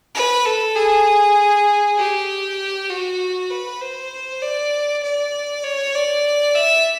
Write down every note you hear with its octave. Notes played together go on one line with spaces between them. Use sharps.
B4
A4
G#4
G4
F#4
B4
C5
D5
D5
C#5
D5
E5